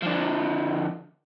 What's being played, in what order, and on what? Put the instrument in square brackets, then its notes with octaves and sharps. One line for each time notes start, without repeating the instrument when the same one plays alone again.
[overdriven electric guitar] D3 F3